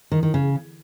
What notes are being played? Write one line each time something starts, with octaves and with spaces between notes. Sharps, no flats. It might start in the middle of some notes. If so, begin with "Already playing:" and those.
D#3
D#3
C#3